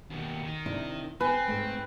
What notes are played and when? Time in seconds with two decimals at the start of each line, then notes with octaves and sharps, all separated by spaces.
0.10 D#2 B2
0.43 D#3
0.66 C3 D4 E4
1.20 B3 C4 B4 G#5
1.48 G#2 A3